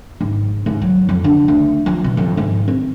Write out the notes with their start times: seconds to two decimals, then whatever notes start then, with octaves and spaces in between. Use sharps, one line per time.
0.21 G#2
0.66 G#2
0.82 F#3
1.09 F2
1.24 D3
1.48 D2
1.86 F3
2.04 B2
2.17 F2
2.37 G#2
2.68 C4